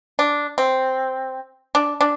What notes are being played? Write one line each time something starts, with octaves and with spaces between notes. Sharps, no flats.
D4
C4
D4
D4